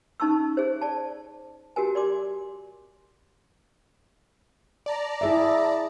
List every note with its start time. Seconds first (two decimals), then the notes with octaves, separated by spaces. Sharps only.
0.20 C#4 D#4 A5 C#6 E6
0.57 G#4 C5
0.81 D5 A5
1.76 F#4 G4 A#4 G#5
1.95 D5 C6 D6
4.86 D5 A5 A#5
5.21 E4 G#4 E5